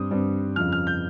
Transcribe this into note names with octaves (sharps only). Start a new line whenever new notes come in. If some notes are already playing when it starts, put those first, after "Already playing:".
Already playing: G2 G3 C4 D#6
G2 G3 C4
F2 C#3 F3 F6
F6
G6